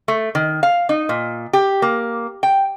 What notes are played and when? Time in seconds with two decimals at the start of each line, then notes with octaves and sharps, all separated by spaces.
0.08 A3
0.35 D#3
0.63 F5
0.89 D#4
1.09 A#2
1.53 G4
1.82 A#3
2.43 G5